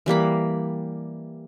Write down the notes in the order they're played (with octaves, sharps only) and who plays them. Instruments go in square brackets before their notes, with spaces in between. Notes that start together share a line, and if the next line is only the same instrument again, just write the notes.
[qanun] E3 G3 A#3 B5